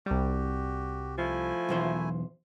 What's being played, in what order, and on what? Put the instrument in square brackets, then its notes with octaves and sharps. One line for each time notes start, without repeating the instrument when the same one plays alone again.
[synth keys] C2 G3 [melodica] F#4 G4
[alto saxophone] F3 [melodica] A3 E4 G#5
[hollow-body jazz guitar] B1 E2 C5